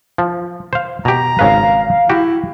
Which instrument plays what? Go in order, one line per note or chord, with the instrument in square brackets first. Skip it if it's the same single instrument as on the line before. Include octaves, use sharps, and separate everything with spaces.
[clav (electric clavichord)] F3
C5 F5
[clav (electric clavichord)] B2 G4 [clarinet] A#5
[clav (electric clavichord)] G#1 C#3 B4 [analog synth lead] F5
[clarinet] E4 [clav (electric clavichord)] F#4 G4